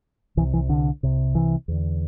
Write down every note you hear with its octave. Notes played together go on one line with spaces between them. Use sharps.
C2 C3 E3
E3
D3
C2 C3
E3
E2 D3